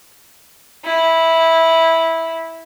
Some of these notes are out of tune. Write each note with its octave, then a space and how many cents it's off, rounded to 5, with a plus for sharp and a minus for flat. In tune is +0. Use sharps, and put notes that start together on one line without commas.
E4 -10